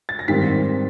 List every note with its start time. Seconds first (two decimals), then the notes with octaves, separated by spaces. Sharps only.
0.09 A6
0.19 A#6
0.28 G#2 D#3 G3 C4 B6